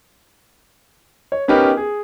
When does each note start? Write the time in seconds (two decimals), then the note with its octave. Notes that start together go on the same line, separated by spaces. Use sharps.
1.32 C#5
1.48 B3 C#4 D#4 G4 A#4 B4
1.77 G#4